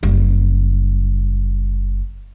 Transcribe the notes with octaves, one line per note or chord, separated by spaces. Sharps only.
F#1 G3